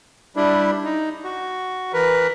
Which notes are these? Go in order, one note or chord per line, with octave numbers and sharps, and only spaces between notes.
G3 D4 E4
D#4
F#4
E3 A#4 B4